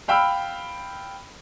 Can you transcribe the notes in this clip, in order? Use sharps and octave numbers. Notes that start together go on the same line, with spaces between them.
F5 G5 B5 E6 F6